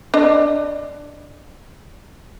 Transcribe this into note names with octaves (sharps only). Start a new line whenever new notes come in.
D4 D#5